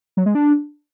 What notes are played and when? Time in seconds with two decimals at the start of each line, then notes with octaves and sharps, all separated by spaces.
0.17 F#3
0.26 G#3
0.35 D4